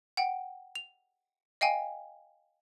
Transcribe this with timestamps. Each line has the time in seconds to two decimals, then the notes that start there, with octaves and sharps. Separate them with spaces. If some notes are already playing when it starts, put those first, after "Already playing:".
0.17 F#5 G5
0.75 F7
1.61 D#5 F5 G5 G#5